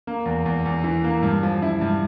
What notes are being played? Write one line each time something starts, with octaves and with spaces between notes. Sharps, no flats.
A#3
E2
E2
E2
E3
A#3
G2
F3
E4
G2